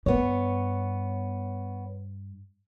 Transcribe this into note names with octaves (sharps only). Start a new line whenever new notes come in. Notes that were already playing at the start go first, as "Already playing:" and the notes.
G2 B3 C#5